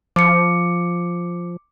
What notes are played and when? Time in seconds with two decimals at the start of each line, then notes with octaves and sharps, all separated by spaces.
0.16 F3 D6 C#7